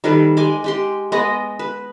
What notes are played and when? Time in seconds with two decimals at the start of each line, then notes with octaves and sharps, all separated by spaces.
0.04 D#3 G3 A4 B4
0.37 G#3 G#5 D6
0.64 G#3 G4 C6
1.12 G#3 B3 D#5
1.59 B4